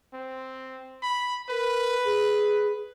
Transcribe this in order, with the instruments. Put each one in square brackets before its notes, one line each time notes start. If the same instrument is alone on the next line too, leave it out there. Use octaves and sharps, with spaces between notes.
[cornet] C4
B5
[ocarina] A#4 [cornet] B4
[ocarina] G#4